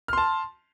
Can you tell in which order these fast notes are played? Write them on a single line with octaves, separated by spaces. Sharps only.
F6 C6 A5